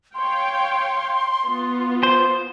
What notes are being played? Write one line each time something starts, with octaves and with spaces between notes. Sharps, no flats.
C#5 F5 G5 C6
B3 F4
C5